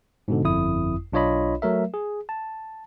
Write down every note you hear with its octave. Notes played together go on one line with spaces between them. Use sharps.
G#2 B2 D3
G1 F2 E4 D#6
B1 D4 F4 C#5 D#5 B5
F#3 A3 A#4 E5
G#4
A5